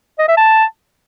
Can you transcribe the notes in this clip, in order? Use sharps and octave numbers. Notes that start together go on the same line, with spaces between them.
D#5
E5
A5